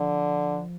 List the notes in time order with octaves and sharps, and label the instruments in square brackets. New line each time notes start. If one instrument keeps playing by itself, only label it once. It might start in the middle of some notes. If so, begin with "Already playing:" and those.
Already playing: [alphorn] D3 [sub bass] F3